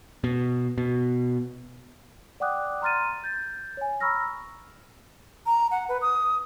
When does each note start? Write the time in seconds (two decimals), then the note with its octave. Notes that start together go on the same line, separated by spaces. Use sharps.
0.24 B2
0.78 B2
2.40 D5 F#5 G5 D6 D#6 F#6
2.82 A#5 C6 F6 A6 D#7
3.24 G6 A6
3.77 C#5 G#5
4.00 A#5 B5 C#6 E6 F6 A#6
5.46 A#5
5.71 F#5
5.89 B4
6.02 D#6